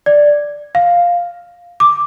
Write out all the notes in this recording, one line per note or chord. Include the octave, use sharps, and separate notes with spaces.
D5
F5
D6